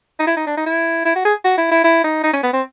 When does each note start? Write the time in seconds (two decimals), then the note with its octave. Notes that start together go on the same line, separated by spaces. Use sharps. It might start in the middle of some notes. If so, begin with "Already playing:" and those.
0.19 D#4
0.27 E4
0.37 D#4
0.46 D4
0.57 D#4
0.66 E4
1.05 E4
1.15 F#4
1.25 G#4
1.45 F#4
1.57 E4
1.71 E4
1.84 E4
2.04 D#4
2.23 D#4
2.33 C#4
2.43 B3
2.53 C4